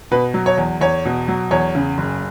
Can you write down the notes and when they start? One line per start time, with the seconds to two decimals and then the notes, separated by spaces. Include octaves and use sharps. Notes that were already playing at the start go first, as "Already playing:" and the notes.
0.11 B2 B4
0.34 F#3
0.46 C#5
0.57 E2
0.81 E2 C#5
1.05 B2
1.28 F#3
1.51 E2 C#5
1.75 C#3
1.98 F#1